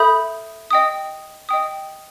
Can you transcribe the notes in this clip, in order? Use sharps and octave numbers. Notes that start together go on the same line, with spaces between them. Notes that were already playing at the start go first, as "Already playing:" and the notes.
Already playing: A4 E5 B5 D#6 G6
D#5 G5 D#6
D#5 G5 D#6